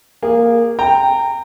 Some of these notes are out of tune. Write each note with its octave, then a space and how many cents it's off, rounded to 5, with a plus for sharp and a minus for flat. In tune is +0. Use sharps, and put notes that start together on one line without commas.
A#3 +0 G#4 -25
G5 +10 A#5 -20